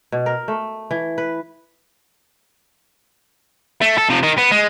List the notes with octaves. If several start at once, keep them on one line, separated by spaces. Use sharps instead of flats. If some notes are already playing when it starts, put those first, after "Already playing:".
B2
A#4
A3
E3
B4
A3
A4
C3 F3
D#3 D#4
B3
G#3